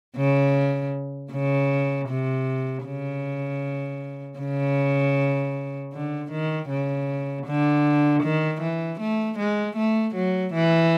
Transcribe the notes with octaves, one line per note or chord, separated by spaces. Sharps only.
C#3
C#3
C3
C#3
C#3
D3
D#3
C#3
D3
D#3
E3
A3
G#3
A3
F#3
E3